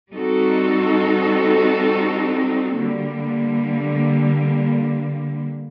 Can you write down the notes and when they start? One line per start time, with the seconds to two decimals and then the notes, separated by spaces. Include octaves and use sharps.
0.12 G3 C4 D#4 F#4 A4
2.78 D3 G3 A#3